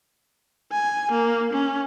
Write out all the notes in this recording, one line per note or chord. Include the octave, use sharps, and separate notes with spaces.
G#5
A#3
C#4